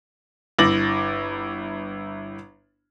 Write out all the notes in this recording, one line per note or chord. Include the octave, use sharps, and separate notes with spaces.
G1 E4 D6 A6 A#6 F#7